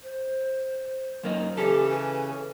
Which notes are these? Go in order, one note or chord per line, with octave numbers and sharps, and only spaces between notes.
C5
F#2 A#3 D#4
C#3 E3 C#4 G4 A4
B4